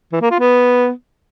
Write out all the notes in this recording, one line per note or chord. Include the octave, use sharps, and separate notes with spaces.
E3
A#3
F4
B3